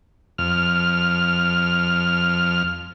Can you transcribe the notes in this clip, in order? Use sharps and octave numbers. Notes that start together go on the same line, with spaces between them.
F2 F6